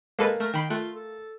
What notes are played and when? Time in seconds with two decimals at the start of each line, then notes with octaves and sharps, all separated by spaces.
0.19 G#3 A#3 A4 B4
0.40 A3 A#4
0.54 D#3 G5 B5 C7
0.70 A3 F4 F#6
0.95 A4